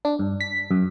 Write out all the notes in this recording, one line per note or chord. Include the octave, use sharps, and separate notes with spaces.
D4
G2
B6
F#2